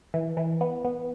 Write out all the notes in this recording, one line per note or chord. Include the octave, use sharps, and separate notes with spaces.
E3
E3
B3
B3